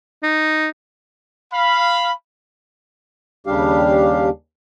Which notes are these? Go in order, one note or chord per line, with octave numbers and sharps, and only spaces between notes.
D#4
F5 B5
D#2 C#3 G3 D4 G4 F5